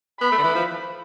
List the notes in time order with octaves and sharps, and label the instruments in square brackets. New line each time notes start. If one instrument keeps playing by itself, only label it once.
[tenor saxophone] B3 [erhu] B5
[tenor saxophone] A3
D3
E3
F3